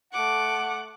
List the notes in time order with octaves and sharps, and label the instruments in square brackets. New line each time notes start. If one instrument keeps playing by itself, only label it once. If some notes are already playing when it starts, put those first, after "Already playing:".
[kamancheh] A3 D6 [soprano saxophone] F#5